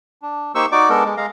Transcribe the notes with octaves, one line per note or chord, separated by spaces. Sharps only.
D4
A#3 D#4 G4 C5 C#6 E6
D#4 F#4 D5 D6
G#3 B3 D4 A4 A#4
G#3
G#3 F5 A#5